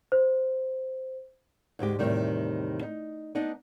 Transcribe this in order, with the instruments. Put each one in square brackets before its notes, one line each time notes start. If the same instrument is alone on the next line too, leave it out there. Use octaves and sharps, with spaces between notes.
[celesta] C5
[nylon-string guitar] D2 G#2 G#3 G4
E2 A2 C3 D#3 G3
D#4
B3 D4 D#4